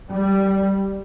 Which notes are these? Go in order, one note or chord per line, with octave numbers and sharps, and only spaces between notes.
G3